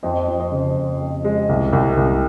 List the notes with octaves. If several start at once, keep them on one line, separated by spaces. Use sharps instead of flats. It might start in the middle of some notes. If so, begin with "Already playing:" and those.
F2 C5 D#5
F2
C5 D#5
C#3
F2
F2
G#3
C2
C2
C2